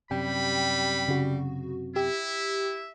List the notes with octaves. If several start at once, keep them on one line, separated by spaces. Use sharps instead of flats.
F#2 C3 G3 G5 B5
C#3 F#4
E4 G4 E5